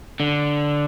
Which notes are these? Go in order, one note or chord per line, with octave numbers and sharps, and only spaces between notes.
D3